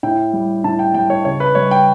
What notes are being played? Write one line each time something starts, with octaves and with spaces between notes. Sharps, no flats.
A2 G5
G3
A2 A5
G5
G3 G5
C#5
C#3 C#5
B4
G3 C#5
G5